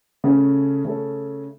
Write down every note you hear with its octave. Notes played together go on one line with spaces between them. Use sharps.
C#3 A3 C#4 A4
C#3 A3 C#4 A4